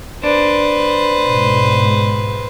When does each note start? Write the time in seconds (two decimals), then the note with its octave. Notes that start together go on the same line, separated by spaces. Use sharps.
0.23 D4 B4 C5
1.26 G#2 B2